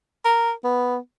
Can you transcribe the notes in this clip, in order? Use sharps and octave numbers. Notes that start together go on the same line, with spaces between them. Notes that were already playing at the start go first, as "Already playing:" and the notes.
A#4
B3